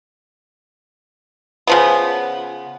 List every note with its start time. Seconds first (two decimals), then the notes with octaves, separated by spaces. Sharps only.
1.67 C#3 F3 B3